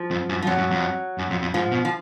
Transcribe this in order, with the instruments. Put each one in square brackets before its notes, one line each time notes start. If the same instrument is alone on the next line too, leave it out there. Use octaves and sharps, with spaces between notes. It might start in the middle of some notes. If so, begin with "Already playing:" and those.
Already playing: [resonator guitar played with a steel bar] F3
[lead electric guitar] F2
F#2
[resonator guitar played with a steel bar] F3
[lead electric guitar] F2 [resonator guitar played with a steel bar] F#3
[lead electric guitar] F#2
F2
F#2
F2
F2
[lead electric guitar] G#2 [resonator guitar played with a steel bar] F3
[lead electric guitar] B2
[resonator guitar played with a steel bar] F3